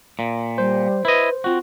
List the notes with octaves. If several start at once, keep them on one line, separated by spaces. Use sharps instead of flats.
A#2
G3 C5
E4 B4 D#5
C4 F4 F#4